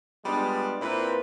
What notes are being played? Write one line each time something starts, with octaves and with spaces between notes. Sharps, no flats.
G3 G#3 B3 D4 F4
A#2 C4 E4 B4